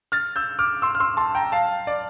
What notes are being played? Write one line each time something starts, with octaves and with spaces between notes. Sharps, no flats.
F6 A6
E6 G6
D6 F6
C6 E6
F6
C6 E6
A5 C6
G5 A#5
F5 A5
D5